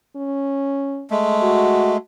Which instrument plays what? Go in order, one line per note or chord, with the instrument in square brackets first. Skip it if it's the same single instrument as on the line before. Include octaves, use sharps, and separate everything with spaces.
[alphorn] C#4
[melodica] G#3 A3
[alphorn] F#4